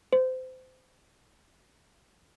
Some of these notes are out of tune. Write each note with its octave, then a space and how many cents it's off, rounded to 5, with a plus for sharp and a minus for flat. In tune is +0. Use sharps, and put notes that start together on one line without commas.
C5 -25